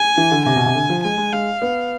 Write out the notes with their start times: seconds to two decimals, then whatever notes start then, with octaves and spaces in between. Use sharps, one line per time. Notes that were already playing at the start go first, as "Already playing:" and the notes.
Already playing: G#5
0.17 E3
0.31 D3
0.46 C3 G#5
0.56 B2
0.66 C3
0.75 D3
0.89 F3
1.04 G#3 G#5
1.18 G#3
1.33 G#3 F5
1.62 B3